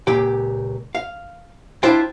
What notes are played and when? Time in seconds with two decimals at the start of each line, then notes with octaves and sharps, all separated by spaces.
0.07 C#2 A#2 G4 G5
0.95 F5
1.83 D4 E4 F4 C5 F5 G5